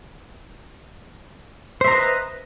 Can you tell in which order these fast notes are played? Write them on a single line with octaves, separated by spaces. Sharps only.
C5 E5 A#5 D#5 B4